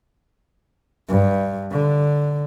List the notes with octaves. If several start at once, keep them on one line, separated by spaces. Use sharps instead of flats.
G2
D3